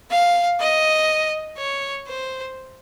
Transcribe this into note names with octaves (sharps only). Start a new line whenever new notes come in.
F5
D#5
C#5
C5